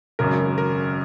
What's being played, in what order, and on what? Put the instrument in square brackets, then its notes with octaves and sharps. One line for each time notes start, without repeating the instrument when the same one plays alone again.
[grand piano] G#1 F#2 C#3 [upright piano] A#4
[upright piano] A#4